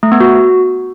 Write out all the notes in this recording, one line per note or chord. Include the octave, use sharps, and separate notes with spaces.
A3
B3
F#4